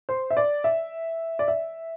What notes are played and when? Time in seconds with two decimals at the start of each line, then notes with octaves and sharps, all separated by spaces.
0.09 C5
0.30 E5
0.37 D5
0.64 E5
1.39 D5
1.48 E5